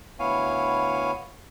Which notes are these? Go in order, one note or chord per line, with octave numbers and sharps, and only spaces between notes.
D2 B3 E4 C#5 F5 G#5